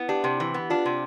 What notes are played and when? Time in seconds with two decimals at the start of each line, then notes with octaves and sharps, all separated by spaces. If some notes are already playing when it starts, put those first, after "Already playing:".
Already playing: B3 E4
0.09 D4 G4
0.24 C3
0.40 E3
0.54 B3
0.70 D4 F4
0.86 C3